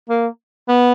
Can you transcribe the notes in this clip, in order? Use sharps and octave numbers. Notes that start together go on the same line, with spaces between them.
A#3
B3